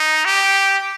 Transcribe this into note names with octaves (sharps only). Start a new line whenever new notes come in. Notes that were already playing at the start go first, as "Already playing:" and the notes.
Already playing: D#4
G4